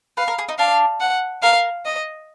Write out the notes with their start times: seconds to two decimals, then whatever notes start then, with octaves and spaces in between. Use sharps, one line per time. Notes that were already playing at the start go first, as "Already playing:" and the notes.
0.17 B4 F5
0.28 A#4
0.39 G#4
0.49 D#4
0.58 D4 F5
1.00 F#5
1.43 A#4 F5
1.85 D#5